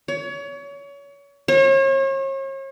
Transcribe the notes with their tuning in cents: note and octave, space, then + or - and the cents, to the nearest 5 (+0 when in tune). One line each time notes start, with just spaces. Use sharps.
C#5 +30
C#5 -40